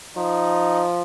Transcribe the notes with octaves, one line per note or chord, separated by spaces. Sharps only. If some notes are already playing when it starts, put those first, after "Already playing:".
F3 D#4